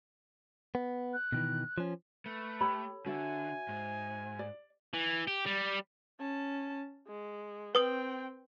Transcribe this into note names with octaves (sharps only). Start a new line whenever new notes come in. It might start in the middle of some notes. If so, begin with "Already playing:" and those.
B3
F#6
B2 D#3 E3
F3 C#4
A3 B4
G4 A4 C#5 B5
D3 F#4 E5 G#5
G#2
D5
E3
G4
G3
C#4 A5
G#3
C4 B4 G5 D#6 F#7